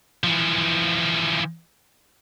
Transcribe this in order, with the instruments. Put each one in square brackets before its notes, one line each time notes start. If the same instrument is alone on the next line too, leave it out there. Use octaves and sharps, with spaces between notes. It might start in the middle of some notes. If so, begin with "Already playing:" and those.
[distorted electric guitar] E3 F3